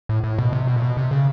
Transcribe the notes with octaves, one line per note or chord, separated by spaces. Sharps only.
A2
A2
B2
C3
B2
A#2
B2
C3
C#3